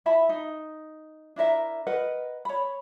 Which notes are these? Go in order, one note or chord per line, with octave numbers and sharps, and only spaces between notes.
E4 E5 A5 B5
D#4
D4 E4 A#4 E5
A#4 B4 D#5 F#5
C#5 B5